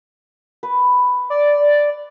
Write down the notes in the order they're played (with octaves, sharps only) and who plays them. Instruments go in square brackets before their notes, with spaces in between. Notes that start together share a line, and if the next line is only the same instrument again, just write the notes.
[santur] B4
[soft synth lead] D5